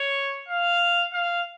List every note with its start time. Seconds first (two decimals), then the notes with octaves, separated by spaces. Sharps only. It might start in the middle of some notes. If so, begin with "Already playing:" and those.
Already playing: C#5
0.49 F5
1.13 F5